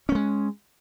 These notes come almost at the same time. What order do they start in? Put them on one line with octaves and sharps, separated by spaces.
C#4 A3 G#3